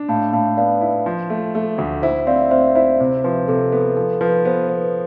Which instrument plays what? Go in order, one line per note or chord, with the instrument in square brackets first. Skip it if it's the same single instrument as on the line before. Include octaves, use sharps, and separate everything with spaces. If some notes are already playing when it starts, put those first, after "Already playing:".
Already playing: [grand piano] D4
[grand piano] A2 [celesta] F5 A5
[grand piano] A2 [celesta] F5 A5
[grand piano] B3 [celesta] D5 F5
[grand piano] E4
F3
A3
A3
D2
[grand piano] E4 [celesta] C5 E5
[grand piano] C4 [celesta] D5 F5
[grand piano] C4 [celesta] C5 E5
[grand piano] E4 [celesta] C5 E5
[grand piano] C3 [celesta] C5
[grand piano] F3 [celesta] B4
[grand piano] C3 [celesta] A4
[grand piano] B3 [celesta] A4
[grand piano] F3 [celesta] A4
[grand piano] F3 [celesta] B4
[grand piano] B3 [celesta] C5
[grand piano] B3 [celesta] B4